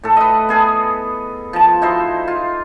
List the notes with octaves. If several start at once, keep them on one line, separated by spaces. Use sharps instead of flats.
A2 A4
B4 D#5
B3 G#4 A4
F3 A5
D#4 E4 F#4 C5
F4